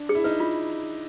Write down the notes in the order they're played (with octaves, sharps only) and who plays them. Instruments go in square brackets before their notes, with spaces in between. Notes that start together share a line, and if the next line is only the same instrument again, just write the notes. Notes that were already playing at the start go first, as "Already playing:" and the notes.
Already playing: [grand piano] D4
[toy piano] G#4
[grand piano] E4
[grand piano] D#4 [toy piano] B4
[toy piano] F4